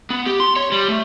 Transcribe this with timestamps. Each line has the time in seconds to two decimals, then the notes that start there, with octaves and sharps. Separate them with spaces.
0.10 B3
0.26 G4
0.40 C6
0.56 C#5
0.72 G3
0.88 A3